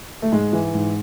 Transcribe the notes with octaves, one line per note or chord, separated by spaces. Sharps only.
A3
G#2 G#3
E3
G#2